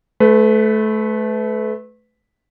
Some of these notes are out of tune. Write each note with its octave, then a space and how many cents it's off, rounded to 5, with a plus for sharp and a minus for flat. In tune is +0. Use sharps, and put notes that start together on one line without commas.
A3 -25 B4 +20